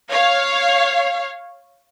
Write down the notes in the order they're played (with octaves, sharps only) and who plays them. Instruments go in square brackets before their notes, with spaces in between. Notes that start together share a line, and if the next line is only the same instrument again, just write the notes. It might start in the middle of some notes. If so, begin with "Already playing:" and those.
[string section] C#5 F5